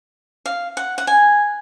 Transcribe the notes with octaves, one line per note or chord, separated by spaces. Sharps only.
F5
F#5
F#5
G#5